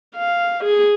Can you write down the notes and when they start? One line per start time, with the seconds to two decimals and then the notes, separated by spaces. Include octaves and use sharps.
0.16 F5
0.64 G#4